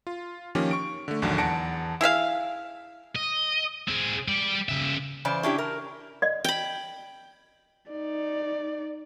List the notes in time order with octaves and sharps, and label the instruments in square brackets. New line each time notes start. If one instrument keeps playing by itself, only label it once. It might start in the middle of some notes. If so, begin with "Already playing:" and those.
[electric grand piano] F4
D#3 F3 A#3 C#4 G4
C#6 D7
D3 A3
A#1 D#2 D3 F#3
E2 F#5 A5 A#6 C#7 D7
[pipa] E4 G#4 E5 F5
[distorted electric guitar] D#5
C4 G#4
G3 D5
C#3 E5
[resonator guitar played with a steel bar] C#3 E3 C5 D5
C#4 D4 E4 G4
A#4
[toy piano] D5 D#5
[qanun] G5 B5
[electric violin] D#4 D5